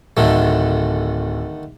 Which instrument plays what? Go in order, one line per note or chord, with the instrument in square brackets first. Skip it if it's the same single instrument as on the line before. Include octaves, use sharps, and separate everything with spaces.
[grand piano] D1 [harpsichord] D3 D#3 A3